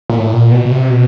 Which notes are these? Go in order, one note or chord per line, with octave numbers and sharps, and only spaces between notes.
A#2
A2
A#2
B2
B2
C3
B2